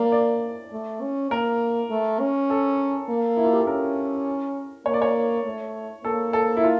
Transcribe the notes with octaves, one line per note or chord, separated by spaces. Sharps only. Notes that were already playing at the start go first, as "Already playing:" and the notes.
Already playing: A#3 D5
D5
A3
C#4
A#3 A#4
A3
C#4
A4
A#3
E4
F4
G4
A4
C#4 A#4
A#3 C#5
D5
C#5
A3
A#3 A4
A4
E4
F4